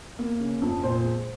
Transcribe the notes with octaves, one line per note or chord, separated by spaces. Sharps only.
A#3
C#3
F2
A#2 C5
G#3